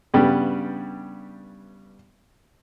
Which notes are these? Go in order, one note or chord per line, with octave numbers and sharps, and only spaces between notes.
G2 C#3 G3 B3